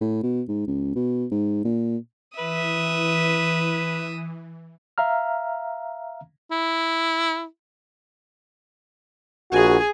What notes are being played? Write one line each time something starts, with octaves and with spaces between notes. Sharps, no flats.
A2
B2
G#2
C#2
B2
G#2
A#2
E3 B4 E5 D#6
E5 F5 A#5 F6
E4
A#1 F#4 G#4 G#5